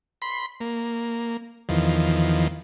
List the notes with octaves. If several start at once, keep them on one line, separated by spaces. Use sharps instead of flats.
B5 C6
A#3
E2 D#3 F3